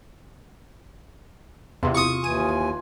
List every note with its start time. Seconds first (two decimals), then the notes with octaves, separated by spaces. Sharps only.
1.83 E2 C3 F4
1.95 C#6 D#6
2.24 D#2 E3 G#5 D#7